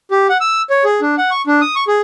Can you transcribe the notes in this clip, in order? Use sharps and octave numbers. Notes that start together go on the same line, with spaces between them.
G4
F#5
E6
C#5
G#4
D4
F#5
C#6
D4
D#6
C#6
G#4